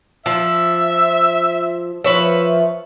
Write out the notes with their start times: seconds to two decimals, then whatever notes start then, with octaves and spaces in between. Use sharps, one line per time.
0.26 F3 E5
2.04 F3 B4 C#5 E5